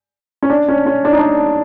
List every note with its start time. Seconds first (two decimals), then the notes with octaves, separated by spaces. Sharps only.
0.43 C#4
0.50 D4
0.69 C#4
0.86 C#4
1.05 D4
1.12 D#4
1.19 D4